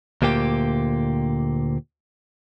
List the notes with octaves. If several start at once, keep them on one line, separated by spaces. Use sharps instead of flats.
D2 A#2 A#3 G4 G5